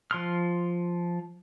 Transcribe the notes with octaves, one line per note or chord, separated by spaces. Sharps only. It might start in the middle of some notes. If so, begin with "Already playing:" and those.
F3 C6 F6